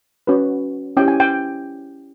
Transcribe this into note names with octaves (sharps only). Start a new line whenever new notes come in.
C#4 F#4 B4
C#4 E4 G4 G5
G#5
G5